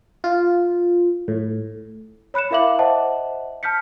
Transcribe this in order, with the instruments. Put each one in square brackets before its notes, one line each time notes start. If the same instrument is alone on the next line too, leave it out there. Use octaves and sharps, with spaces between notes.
[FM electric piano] F4
A2
[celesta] C#5 B5 F#6 C#7 E7
E4 A#4 E5 F5 D6 F#7
C5 D#5 E5 F#5 A5
A5 F6 G6 B6 C#7